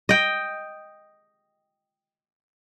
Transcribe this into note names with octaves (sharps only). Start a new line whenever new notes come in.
D#5 G5